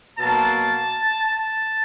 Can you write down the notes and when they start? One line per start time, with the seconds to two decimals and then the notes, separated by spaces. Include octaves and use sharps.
0.19 B2 F#3 A#3 A5
1.25 A5